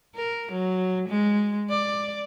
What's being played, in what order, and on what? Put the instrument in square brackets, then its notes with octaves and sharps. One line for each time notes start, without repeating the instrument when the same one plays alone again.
[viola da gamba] A#4
F#3
G#3
D5